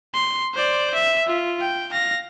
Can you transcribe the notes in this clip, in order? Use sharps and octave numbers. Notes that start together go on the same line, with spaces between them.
C6
C5 D5
E5
F4
G5
F5 A#6